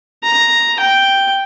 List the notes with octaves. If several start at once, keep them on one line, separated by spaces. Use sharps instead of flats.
A#5
G5